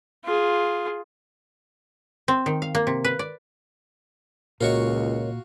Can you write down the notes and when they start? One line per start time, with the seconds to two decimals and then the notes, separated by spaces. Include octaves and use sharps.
0.25 F4 G#4
2.28 C4
2.46 D#3
2.62 F5
2.75 A#3
2.87 C3
3.04 B4
3.19 D5
4.61 C#2 A#2 F4 F#4 A#4 C#5 D#5 C#6